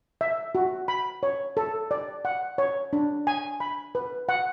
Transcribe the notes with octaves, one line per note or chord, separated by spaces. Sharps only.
E5
F#4
B5
C#5
A4
D5
F#5
C#5
D4
G#5
B5
B4
F#5